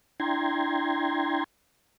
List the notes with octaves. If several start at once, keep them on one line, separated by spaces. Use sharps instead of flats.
D4 E4 G5 A#5 C6 G#6